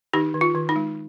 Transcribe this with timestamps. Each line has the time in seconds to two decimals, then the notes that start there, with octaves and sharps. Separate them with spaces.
0.13 D#3 D#4 G4
0.34 D#3
0.41 F4
0.55 D#3
0.69 D#4
0.76 G#3